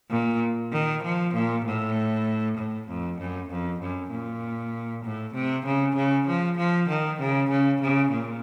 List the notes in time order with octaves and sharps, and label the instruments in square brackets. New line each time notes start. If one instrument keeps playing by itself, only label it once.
[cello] A#2
D#3
F3
A#2
A2
A2
F2
F#2
F2
F#2
A#2
A2
C3
C#3
C#3
F3
F3
D#3
C#3
C#3
C#3
A#2